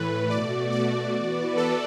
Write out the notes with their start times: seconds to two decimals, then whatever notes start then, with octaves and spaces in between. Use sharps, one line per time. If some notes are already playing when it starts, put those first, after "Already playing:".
Already playing: A2 E3 A3 B4
0.29 B2 A3 F#4 D5
0.71 D5
1.14 E3 B3 F#4 B4
1.57 A4